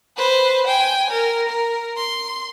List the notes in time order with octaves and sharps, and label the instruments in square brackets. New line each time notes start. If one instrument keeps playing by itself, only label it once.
[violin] B4 C5
G5 G#5
A#4
A#4
C6